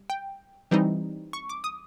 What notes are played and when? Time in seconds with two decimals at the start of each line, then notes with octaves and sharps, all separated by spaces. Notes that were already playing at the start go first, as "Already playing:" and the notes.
Already playing: G3
0.10 G5
0.71 E3 G3 C4 D#4
1.33 C#6
1.49 D6
1.64 D#6